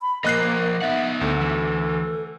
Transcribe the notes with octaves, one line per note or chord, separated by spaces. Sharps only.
B5
F3 A#3 A#4 C5 D#5 F#6 C7
B3 D#4 E5 F#5
D2 A4
E3